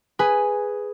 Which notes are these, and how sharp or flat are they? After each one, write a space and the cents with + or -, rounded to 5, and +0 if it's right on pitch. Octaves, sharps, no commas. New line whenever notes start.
G#4 +0 B4 +5 G#5 +0